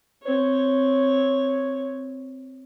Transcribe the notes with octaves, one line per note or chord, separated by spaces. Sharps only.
C4 C#5